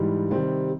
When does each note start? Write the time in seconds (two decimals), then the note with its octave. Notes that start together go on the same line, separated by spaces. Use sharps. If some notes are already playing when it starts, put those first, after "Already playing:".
Already playing: G#2 E3 G3
0.31 C3 D#3 G3 C4